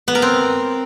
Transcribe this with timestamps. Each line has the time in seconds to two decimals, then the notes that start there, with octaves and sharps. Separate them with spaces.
0.08 B3
0.15 A#4
0.22 C4